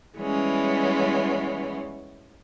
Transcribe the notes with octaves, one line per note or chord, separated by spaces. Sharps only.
E3 G3 G#3 B3 C#4